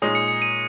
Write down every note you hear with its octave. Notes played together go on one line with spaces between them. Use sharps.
A#2 G#3 D#4 G#4 C#5 D#6
C#7
C#7
D#7